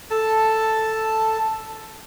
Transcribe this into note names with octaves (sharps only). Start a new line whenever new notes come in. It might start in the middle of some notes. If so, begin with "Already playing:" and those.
A4 A5